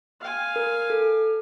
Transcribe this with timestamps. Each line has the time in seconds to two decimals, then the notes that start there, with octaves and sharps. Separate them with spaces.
0.21 F5 G#5
0.56 A#4
0.90 A4